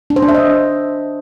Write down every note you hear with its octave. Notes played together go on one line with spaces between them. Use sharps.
D4
C5
D4
E5
D#5